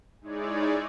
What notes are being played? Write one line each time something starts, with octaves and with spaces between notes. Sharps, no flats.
G#3 D#4 E4 G#4 C#5 D5